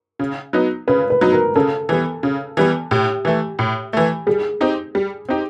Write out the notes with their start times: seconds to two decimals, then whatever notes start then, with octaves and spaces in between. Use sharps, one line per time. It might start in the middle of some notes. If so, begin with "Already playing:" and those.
0.19 C#3
0.53 F#3 B3 D#4
0.88 C#3 B4
1.10 B4
1.21 F#3 B3 D#4
1.32 A#4
1.55 C#3 A4
1.89 E3 G3 B3
2.23 C#3
2.57 E3 G3 B3
2.91 A2 G4
3.25 E3 A3
3.59 A2
3.93 E3 A3
4.27 G3 G#4
4.61 C4 D#4 G4
4.95 G3
5.29 C4 D#4 G4